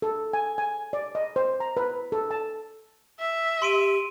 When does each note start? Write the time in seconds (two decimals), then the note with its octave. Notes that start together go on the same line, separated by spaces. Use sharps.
0.02 A4
0.33 G#5
0.58 G#5
0.93 D5
1.15 D#5
1.36 C5
1.60 A#5
1.77 B4
2.12 A4
2.31 A5
3.20 E5
3.62 G4 C6 D7 D#7